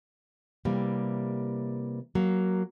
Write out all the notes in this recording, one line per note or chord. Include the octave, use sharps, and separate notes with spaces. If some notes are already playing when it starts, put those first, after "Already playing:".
C3 E3 G3 A#3
F#3 A#3